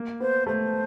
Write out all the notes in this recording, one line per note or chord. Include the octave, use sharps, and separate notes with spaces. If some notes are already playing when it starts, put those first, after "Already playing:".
Already playing: A#3
B3 C5
A3 C5